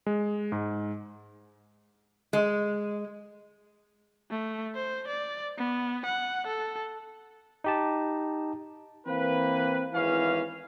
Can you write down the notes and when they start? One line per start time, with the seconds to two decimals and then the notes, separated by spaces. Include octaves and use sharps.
0.06 G#3
0.52 G#2
2.33 G#3
4.31 A3
4.75 C5
5.08 D5
5.58 B3
6.06 F#5
6.47 A4
7.64 D#4 G4 A5
9.06 E3 A#3 C4 B4
9.93 G#1 E2 E3 C#4 F5